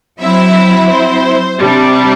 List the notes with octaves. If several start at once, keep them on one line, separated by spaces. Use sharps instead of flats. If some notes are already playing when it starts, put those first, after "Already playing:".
F#3 C4 E4 E5
C5
C3 G3 D4